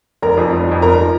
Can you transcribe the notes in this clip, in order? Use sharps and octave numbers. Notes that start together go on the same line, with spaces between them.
F1 A#4 A#5
F2 F3
F1
F2 F3
F1 A#4 A#5
F3